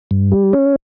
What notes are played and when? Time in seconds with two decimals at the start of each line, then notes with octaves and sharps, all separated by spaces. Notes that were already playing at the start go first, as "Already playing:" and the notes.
0.11 G2
0.32 G3
0.53 C#4